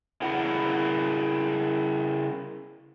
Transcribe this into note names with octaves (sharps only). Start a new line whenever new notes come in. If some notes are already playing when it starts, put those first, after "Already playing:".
C#3 E4 F#5